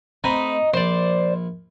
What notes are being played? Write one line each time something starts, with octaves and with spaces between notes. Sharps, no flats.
A3 C4 D#4 B4
A#1 C5 D5